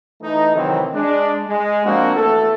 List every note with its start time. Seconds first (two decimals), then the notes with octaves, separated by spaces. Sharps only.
0.21 E3 A3 D#4
0.55 C3 D#3 E3 F#3 C4
0.94 G#3 D4
1.48 G#3
1.85 F3 A#3 C4 D4 F#4
2.16 E2 A3 F#4 A4